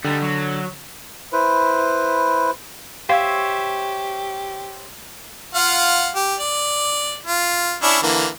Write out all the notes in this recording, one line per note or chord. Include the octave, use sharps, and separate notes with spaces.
D3 G3 D#4
F#3
E4 B4 C5
G4 C5 C#5 E5 F5
F4 F5 F#5
G4
D5
F4
C#4 D4 E4
D3 E3 A#3